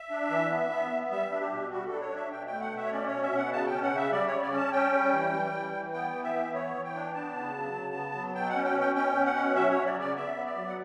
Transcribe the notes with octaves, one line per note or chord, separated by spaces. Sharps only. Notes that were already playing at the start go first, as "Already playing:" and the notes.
Already playing: E5
D4
E3
B3
B3
B3
G3 E5
D4
G4
B2
G3 F#4
A4
D4
C#5
D4
E5
B2 G5
G5
A3
F#5
B2 E5
C#5
C#4 D5
B2 C#5
E5
B2 F#5
C#3 A5
G5
C#4
F#5
C#3 E5
G3 D5
C#5
C#3
D5
C#4 A5
C#4 G5
G3
E3
G3
E3
E3
B3 G5
E3
E5
B3
E3 C#5
E3
G5
D4
B3 A5
C#3
F#3
C#3
B3
F#3
B2 G5
F#5
C#4
G5
B2
G5
C#4 G5
B2
F#5
C#4
F#3 E5
C#5
F#3
D5
C#3 D5
B3 E5
B3
D5
F#3
F#5